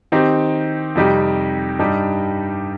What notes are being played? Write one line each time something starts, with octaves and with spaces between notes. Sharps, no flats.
D#3 C4 D#4 G4
F2 C3 G3 D#4 G4
G2 G3 D#4 G4